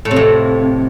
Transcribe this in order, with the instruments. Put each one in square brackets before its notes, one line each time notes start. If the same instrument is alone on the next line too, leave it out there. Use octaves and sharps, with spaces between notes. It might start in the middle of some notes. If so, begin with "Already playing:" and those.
[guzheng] A2
C3
F2